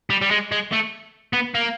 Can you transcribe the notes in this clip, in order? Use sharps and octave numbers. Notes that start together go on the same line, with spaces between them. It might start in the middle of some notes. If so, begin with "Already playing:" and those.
G3
G3
G#3
G#3
A3
B3
A#3